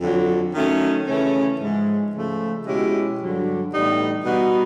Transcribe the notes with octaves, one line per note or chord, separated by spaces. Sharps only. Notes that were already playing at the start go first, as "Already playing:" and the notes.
F2 D3 F#3
D#3 F#3 A3 C#4
C#3 E3 A3 C#4
G#2 F3 G#3
C#3 F3 A3
B2 G#3 C#4 E4 G4
G2 D3 F#3
A2 E3 G3 B3 D#4
B2 G3 B3 D#4 F#4